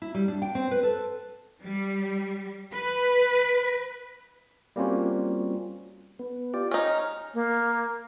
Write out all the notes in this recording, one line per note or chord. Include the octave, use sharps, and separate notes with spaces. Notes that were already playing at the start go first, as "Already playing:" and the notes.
E4
G3
D4
G5
C4
B4
A4
G3
B4
G3 A#3 C4 C#4 F4 F#4
B3
F4 G4 D5
C#4 D#4 F6
A#3